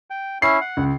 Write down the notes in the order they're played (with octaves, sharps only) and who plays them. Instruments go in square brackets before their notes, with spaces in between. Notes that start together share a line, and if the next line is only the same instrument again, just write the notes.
[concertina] G5
[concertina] C#4 E4 [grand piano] C7
[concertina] F#5
[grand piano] C#2